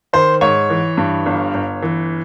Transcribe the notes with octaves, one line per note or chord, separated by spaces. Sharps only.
D#3 C5
G#2 C#5
E3
G2
G1
G1
E3